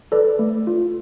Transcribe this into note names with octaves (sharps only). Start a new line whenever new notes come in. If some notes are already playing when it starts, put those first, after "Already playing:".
A4 B4 D5
A3
F4